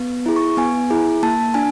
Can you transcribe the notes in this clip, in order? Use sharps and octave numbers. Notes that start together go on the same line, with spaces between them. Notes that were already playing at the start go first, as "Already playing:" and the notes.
Already playing: B3
E4 G#4
C#6
B3 G#5
E4 G#4
A#3 A5
D4 G#5